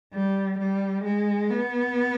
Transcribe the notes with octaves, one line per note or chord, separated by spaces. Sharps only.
G3
G3
G#3
B3